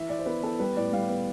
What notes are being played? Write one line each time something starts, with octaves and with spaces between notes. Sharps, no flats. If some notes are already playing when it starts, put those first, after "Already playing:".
Already playing: E3 E5
E4 D5
C5
B3 B4
B3 A4
G3 B4
A2 D5
G3 F5
B3